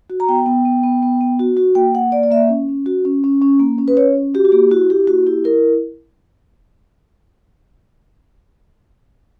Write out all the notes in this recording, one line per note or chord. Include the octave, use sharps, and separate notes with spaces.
F#4
A#5
B3 G5
B3
B3
B3
B3
B3
F#4
F#4
A#3 G5
A#3 F#5
A#3 D5
D5
A#3 E5
C#4
C#4
F#4
C#4
C#4
C#4
A#3
C#4
B4
C#4 C#5
C#4
F#4 G4
F#4
A#3 G4
E4 F#4
E4 G4
A#3 F#4
E4 G4
E4 A#4